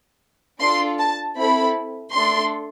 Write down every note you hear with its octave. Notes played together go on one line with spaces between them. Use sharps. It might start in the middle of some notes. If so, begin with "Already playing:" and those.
D4 F4 A4 C6
A5
C4 E4 A4 B5
A3 D4 A4 C6